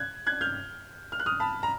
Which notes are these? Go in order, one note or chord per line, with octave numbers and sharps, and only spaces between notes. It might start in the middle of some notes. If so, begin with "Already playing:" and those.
Already playing: F#6 G#6
F#6 G#6
F6 G6
F6
F#6
D#6 F6
A5 B5
A#5